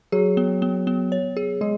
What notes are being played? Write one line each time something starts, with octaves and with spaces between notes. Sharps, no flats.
F#3 G#4
B3
B3
B3
C#5
G#4
G#3 G#4